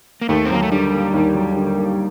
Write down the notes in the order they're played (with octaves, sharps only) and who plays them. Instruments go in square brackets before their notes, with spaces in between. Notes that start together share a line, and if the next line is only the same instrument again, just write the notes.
[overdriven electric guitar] A#3
[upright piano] D#2 [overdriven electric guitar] A3
[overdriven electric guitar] C4
[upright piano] F#3 [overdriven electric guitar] A#3
[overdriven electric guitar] A3
[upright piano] D3 [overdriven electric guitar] G3
[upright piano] A#3
D#2
F#3
D3
A#3